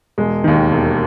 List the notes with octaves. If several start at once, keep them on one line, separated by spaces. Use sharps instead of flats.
E1 G#3
D#2 D#3
E1